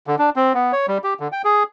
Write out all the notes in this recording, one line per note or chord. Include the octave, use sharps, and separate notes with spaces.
D3
D4
C4
B3
C#5
G3
G4
D3
G5
G#4